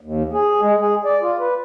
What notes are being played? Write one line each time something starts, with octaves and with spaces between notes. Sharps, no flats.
D#2
G#4
G#3
G#4
D5
F4
B4